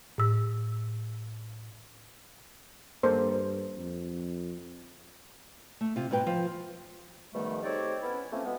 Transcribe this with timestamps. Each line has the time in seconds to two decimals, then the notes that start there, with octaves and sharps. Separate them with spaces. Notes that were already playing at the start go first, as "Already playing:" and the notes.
0.18 A2 E6
3.03 G2 A#3 A4 C5
3.77 F2
5.81 A3
5.96 C3 F4
6.11 G#2 B2 B4 G5
6.27 F3
7.34 G#2 B2 D#3 F3 G3 A3
7.63 C4 D#4 G4 A4 C#5 D5
8.02 B3 C#4 E4
8.31 F3 A3 A#3 C4 C#4
8.44 B2 E3 G#3 B3